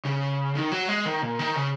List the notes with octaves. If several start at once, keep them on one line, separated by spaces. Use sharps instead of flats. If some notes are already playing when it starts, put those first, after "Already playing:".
C#3
D#3
F#3
G#3
D#3
A#2
D#3
C#3